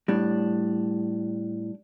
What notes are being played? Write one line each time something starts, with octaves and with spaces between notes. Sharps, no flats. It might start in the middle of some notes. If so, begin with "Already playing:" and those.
A2 G3 D4